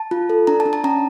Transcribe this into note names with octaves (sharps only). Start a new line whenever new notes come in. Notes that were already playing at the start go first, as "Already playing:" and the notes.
Already playing: A5
F4
A4
D4 A#5
A5
D4
A5
C#4 A#5